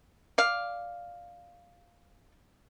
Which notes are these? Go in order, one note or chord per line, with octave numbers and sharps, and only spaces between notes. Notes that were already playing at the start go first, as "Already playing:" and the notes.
D5 F5